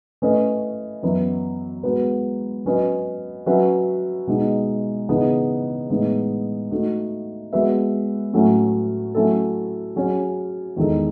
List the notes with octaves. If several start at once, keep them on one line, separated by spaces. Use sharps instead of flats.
A3 C#4 E4 B4 D#5
F#2 E3 B3 E4 B4
G#3 B3 F#4 B4
F#3 C#4 F#4 B4 D#5
F#3 C#4 F#4 B4 E5
B2 G#3 D#4
C#3 E3 B3 D#4
A2 E3 G#3 B3 D#4
A3 D#4 F#4
G#3 B3 F#4 B4 E5
A2 F#3 A3 C#4 E4
F#3 A3 C#4 E4 A4
F#3 C#4 G#4 C#5
E2 D#3 G#3 D#4 A4